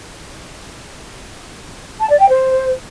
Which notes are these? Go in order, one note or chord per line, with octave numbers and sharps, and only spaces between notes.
A5
D5
G5
C5